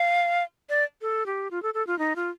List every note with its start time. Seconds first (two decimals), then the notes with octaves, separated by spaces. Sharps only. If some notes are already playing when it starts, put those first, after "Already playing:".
Already playing: F5
0.69 D5
1.01 A4
1.26 G4
1.51 F4
1.63 A4
1.74 A4
1.87 F4
1.99 D#4
2.16 F4